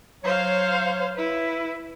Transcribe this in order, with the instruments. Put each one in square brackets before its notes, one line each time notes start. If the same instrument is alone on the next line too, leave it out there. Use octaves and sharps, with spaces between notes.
[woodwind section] F#3 C#5 [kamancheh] C5 F5
[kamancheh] E4 B4